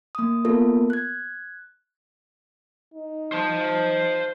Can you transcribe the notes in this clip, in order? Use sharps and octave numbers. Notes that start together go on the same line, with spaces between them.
A#3 D#6
A#3 B3 F4 A4 A#4
F#6 G#6
D#4
C5 A5